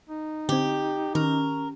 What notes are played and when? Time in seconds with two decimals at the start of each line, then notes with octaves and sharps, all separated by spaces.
0.09 D#4
0.49 D3 C4 G4
1.15 D#3 C#4 A#4